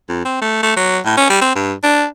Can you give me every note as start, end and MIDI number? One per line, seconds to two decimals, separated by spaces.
0.09 0.23 41
0.25 0.37 60
0.41 0.59 57
0.63 0.71 57
0.76 0.99 54
1.05 1.14 45
1.17 1.27 61
1.29 1.40 55
1.41 1.51 60
1.55 1.73 43
1.83 2.05 62